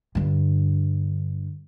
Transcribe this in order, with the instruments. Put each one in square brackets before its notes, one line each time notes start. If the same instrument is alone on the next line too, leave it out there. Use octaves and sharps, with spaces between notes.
[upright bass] G2 D3